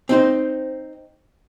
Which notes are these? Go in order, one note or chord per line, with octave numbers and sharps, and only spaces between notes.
C4 D#4 C5